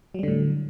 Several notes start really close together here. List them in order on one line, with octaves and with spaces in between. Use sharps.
F#3 G3 D3 A2